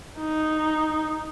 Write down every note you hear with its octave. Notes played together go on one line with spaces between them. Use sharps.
D#4